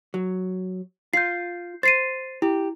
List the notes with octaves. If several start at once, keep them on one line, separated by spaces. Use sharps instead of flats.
F#3
F4 G6 C7
C5 A6 C7 D#7
E4 G4